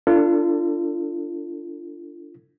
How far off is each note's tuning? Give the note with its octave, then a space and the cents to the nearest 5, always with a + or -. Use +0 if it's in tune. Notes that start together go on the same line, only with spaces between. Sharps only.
D4 +0 F4 -30 A4 +25